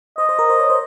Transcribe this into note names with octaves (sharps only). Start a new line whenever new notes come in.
C5 D#5
C5
A#4
C5
C#5
C5